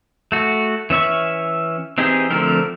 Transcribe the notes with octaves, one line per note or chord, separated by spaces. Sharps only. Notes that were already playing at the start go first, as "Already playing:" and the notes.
A3 F#4
E3 C#4 E5 C#6
E3 C4 D#4 G4 G#4
D3 F3 A3 C4 A#4